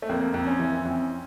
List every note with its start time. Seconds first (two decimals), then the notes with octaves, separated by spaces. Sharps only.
0.02 A3
0.09 F2 A#3
0.34 F2
0.47 C#4
0.59 E3
0.85 F2